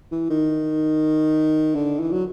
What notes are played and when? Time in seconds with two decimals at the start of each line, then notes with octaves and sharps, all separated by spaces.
0.12 E3
0.30 D#3
1.75 D3
2.00 E3
2.12 F#3